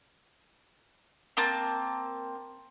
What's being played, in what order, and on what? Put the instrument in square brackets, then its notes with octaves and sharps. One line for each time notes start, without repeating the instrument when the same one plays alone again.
[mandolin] A#3 C4 A5